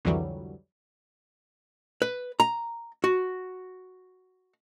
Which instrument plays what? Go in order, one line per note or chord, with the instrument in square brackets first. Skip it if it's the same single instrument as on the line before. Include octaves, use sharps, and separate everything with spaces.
[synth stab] C2 F2 D3 E3 F#3 G3
[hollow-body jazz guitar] B4
A#5
F#4